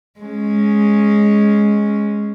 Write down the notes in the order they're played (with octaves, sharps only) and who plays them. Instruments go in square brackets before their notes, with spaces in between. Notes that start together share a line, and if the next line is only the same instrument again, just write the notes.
[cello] G#3 C#4